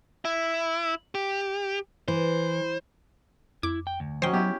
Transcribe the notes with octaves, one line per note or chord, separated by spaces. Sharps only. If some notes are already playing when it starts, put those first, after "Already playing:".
E4
G4
E3 C5
F2 E4 D6
G5
D2
F3 F#3 C#4 C5 D#5 G5
F#3 B3 E4 G4